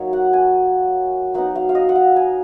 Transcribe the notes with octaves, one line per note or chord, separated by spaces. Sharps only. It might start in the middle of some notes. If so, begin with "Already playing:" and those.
Already playing: F#3 A#3 D#4 C#5
F#5
G#5
F#3 B3 D#4 F#5
F5
F5
D#5
F#5
F5
G#5